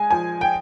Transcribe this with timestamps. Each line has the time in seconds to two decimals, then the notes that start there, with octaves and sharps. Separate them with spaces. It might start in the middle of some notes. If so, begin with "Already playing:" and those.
Already playing: G#3 G#5
0.11 F3 G#5
0.41 G5